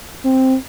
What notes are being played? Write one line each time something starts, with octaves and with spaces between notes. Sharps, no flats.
C4